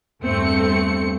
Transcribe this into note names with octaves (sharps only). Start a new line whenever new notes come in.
E2 G2 A3 C4 C#7